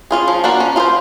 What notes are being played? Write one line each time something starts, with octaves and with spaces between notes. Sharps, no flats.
C#4 F4 G#4
F3
A#3 D4 F#4
C#4
F4 G#4 C5